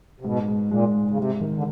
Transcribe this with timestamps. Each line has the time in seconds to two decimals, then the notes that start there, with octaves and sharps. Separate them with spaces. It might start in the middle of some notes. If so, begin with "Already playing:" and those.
0.21 C3
0.25 G#2 B2
0.48 G#2
0.71 A#2 G#3
0.95 G#2
1.09 C#3
1.17 C3 G#3
1.41 D#3
1.56 D3